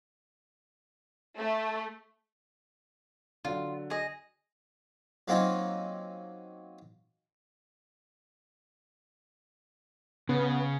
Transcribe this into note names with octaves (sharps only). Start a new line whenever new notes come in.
A3
D3 F#3 F4
G#4 D#5
F#3 A#3 C4 C#4 D#4 F4
C#3 B3